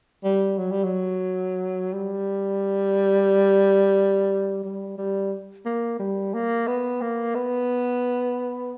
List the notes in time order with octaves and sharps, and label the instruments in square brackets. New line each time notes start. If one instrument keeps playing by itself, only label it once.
[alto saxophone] G3
F#3
G3
F#3
G3
G3
G3
A#3
G3
A#3
B3
A#3
B3